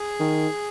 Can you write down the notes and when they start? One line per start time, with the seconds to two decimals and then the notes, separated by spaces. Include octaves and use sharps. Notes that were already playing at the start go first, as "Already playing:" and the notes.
Already playing: G#4
0.20 D#3